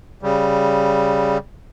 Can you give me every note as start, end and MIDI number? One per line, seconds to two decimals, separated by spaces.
0.22 1.38 49
0.22 1.38 55